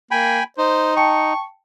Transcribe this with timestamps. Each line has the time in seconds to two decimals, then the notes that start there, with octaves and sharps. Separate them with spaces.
0.11 A#3 G5 G#5 B5
0.58 D#4 C5
0.97 G5 A5 C#6 C#7